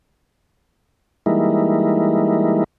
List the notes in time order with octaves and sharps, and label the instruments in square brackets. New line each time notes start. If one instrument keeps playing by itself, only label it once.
[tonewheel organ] E3 G3 G#3 A#3 D#4 E4